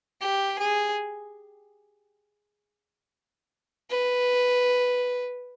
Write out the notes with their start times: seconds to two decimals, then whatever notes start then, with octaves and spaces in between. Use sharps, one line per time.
0.21 G4
0.59 G#4
3.90 B4